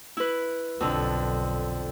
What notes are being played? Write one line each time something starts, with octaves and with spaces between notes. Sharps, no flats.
E4 B4
B1 F2 D3